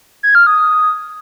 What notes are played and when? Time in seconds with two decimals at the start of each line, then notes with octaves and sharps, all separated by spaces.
0.23 G#6
0.35 F6
0.47 D#6